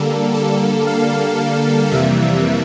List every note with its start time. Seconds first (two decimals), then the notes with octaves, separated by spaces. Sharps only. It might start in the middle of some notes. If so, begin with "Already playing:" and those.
Already playing: D3 G3 A#3 A4
0.34 A4
0.87 F5
1.91 F2 C3 E3 G3 A#3 E5